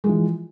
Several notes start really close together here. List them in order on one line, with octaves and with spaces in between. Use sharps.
G#3 F3 E3